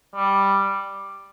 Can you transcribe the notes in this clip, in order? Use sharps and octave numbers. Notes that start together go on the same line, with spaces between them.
G3